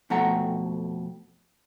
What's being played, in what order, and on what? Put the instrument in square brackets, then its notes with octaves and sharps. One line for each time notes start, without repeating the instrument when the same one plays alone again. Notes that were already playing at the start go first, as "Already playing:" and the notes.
[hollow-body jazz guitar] F2 B2 A3 F#5 A#5